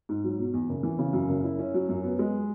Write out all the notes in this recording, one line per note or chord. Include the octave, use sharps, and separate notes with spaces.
G#2
F#3
B2
E2
F#1
E3
C#3
F#2
F#1
E4
C#4
F#3
F#2
B3
G#3